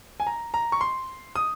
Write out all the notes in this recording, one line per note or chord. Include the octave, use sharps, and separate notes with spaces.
G#5
A#5
A#5
C#6
C6
D#6